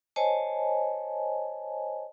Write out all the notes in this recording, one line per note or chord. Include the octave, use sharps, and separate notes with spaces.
C5 C#5 D#5 G#5 A5